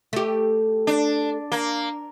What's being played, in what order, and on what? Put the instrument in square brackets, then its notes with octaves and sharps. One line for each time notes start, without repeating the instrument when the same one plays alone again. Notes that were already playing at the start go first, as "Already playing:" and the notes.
[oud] A3 G4
[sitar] D4
A#3